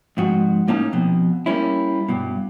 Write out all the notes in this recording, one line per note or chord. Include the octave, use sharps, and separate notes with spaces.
F2 G#2 F#4
A2 A#3 C#4 D#4 A5
F2 B2
G3 A#3 C#4 E4
G2 B2